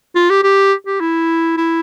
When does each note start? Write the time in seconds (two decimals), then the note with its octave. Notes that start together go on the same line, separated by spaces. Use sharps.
0.15 F4
0.30 G4
0.43 G4
0.86 G4
1.00 E4
1.57 E4